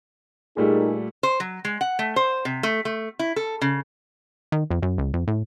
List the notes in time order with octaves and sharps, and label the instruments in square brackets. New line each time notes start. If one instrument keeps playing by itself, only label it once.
[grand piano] A#2 G3 A3 [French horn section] D#4 G#4 A#4
[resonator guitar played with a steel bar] C5
F#3
G#3
F#5
A3
C5
C3
A3
A3
E4
A4
C#3
[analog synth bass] D#3
F2
F#2
C#2
F2
A2